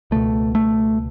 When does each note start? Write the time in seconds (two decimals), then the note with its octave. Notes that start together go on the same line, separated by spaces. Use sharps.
0.11 C#2 B2 A3
0.55 A3